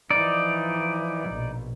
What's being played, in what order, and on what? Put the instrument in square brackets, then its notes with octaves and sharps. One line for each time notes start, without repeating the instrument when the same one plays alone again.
[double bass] E3 F3 [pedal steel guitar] D#4 D5
[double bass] A#1 B2